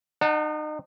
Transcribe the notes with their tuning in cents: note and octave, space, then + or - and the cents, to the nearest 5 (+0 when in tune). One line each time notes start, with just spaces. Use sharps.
D#4 -35 F#5 +0 A5 +25